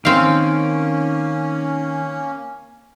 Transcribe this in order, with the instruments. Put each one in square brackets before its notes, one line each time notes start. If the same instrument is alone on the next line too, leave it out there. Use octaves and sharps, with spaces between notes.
[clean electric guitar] D#3 [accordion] A#3 C#4 [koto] C4 F5